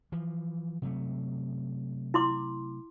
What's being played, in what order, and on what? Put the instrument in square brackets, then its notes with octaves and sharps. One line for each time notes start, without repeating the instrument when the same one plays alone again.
[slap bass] E3 F3
C3 F#3 A3
[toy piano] E4 C6 D6